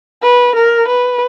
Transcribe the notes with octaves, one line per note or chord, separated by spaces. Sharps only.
B4
A#4
B4